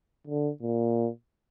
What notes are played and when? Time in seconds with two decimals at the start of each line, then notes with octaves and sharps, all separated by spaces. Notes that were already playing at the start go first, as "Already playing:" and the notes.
0.27 D3
0.62 A#2